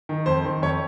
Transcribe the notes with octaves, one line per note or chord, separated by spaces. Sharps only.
D#3
F2 C5
D#3
F2 C#5